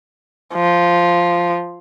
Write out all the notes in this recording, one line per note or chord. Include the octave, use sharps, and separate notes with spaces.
F3